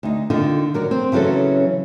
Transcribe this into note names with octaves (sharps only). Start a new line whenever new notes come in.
D2 D#4
D3 D#3 D#4 F4
F#3 A#4 D5
C4 C5
C#3 E3 F#3 C#4 A4